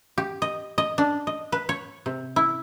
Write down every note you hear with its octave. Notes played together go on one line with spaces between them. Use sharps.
G4
D#5
D#5
D4
D#5
B4
C#5
C3
E4